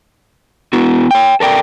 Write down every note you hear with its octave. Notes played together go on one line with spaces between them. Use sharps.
B3 E4 F#4
C#5 G5
A4 A#4 D5 G5